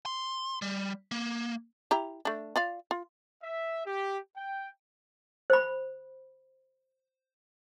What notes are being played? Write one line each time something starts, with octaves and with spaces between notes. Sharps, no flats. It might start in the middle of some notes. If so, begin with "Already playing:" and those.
C6
G3
A#3
E4 G4 A#5
A3 D4
F4 D5 F5
F4
E5
G4
G5
C5 B5